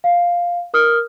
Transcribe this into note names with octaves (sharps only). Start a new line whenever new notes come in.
F5
A#4 D#6 F6